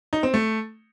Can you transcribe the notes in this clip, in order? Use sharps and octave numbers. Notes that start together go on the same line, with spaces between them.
D#4
C4
A3